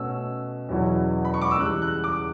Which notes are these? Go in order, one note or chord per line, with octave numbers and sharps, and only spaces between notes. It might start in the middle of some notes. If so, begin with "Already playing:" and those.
Already playing: B2 A3 C#4 E6
E2 B2 F#3 C#4 E4
B5
C#6
D6
E6
C#3 E3 G3 F#6
F#6
D6